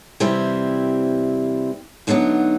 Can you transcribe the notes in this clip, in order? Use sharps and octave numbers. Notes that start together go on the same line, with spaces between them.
C3 E3 G3 C4 E4
D2 D3 F#3 B3 D#4